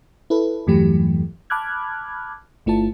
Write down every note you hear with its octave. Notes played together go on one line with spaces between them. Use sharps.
E4 A4 B4
E2 G2 E3 F#3 A3 G4
A5 B5 D6 F6 F#6 G#6
G1 A3 E4 F4 A5